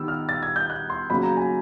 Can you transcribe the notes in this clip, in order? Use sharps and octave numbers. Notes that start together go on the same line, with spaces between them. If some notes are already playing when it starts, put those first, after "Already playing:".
Already playing: D#3 G3 B3 E6
F6
A6
G#6
G6
F#6
C6
C#3 F#3 A#3 B5
A#5
G#5